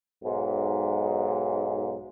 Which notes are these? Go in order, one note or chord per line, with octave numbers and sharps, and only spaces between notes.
B1 G#2